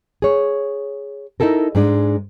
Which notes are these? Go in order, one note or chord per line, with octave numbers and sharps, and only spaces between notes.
G#4 C#5
D#4 E4 G4 A4 A#4
G#2 G#3 D4